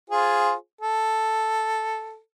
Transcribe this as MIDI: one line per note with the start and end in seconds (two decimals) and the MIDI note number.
0.10 0.54 65
0.10 0.54 68
0.10 0.54 72
0.81 2.19 69